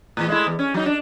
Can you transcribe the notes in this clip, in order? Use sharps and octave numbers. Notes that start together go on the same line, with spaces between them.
E2 A2
G#3 A3 E4
E2
C#4
F#3 D#4
D4